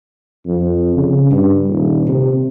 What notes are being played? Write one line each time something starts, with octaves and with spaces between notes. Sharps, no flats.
F2
C#3
G2
D#1
C3